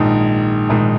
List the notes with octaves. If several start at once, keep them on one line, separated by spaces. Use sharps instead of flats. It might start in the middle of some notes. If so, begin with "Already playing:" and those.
Already playing: A#1 G#2 D#3
A#1 G#2 D#3